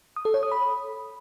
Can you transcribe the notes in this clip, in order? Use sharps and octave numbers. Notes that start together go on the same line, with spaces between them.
D#6
A4
C#5
D#6
B5